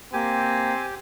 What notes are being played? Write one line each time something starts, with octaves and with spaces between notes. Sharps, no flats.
A#3 C4 G4 G#5